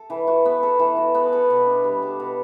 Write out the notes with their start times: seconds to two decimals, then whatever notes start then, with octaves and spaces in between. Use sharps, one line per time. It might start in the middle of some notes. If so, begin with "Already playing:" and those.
Already playing: A4
0.10 E3
0.27 F#4
0.45 B3
0.63 A4
0.79 E3
0.97 F#4
1.14 B3
1.33 A4
1.50 B2
1.66 D4
1.84 G3
2.02 A4
2.20 B2